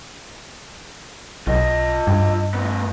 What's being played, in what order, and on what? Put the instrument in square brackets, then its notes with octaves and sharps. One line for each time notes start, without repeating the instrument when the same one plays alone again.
[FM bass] B1 [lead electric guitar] F4 D#5
[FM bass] G2
[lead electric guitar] A2 B3